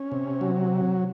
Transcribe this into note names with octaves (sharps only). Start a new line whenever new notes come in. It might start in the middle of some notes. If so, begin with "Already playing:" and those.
Already playing: C#4
C3
F#3